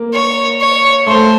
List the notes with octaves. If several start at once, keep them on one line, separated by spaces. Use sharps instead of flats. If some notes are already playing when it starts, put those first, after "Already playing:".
Already playing: A#3
C#5
C#5
A3 C5